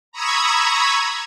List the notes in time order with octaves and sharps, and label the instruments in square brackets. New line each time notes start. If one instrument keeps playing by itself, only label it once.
[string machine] A#5 B5 C#6 D#6 E6 G#6